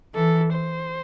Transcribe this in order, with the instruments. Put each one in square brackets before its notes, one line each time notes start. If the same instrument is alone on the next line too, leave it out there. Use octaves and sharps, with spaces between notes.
[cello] E3 [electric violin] A4
[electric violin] C5